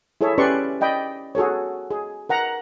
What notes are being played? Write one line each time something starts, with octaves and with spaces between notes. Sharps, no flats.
E4 G#4 A4 C#5 E5
C#4 G4 B4 D5 C6 C#6
D5 D#5 G5 B5
F#4 G#4 A4 C#5
G#4
A#4 F#5 A#5